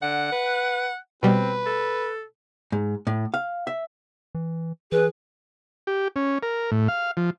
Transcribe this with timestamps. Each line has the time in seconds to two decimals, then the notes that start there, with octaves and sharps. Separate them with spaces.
0.02 D3 F#5
0.32 B4
1.23 B2 G3 C4 B4
1.66 A4
2.72 G#2
3.07 A2
3.34 F5
3.67 E5
4.35 E3
4.92 E3 G#4 B4
5.87 G4
6.16 C#4
6.43 A#4
6.71 A2
6.88 F5
7.17 F3